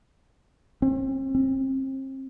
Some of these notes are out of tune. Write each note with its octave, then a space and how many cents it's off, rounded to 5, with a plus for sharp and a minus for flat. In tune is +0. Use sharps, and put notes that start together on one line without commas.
C4 +40
C4 +35